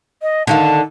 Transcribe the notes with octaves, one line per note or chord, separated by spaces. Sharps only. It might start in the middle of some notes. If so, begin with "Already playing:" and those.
D#5
D3 D#3 F5 A5